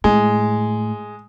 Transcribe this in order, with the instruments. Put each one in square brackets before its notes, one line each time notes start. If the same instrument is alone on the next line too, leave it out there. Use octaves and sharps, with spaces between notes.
[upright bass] A2 [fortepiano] G#3